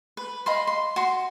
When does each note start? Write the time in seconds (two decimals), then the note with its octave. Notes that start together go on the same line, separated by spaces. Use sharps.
0.17 B4
0.46 D#5 F5 B5 C6
0.67 C6
0.96 F#4 C6